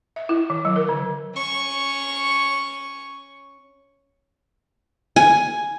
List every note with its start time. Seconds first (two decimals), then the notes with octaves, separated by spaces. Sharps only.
0.16 E5
0.29 E4
0.50 D#3
0.65 F#3
0.76 A#4
0.89 D3
1.34 C#4 C#6
5.16 G#5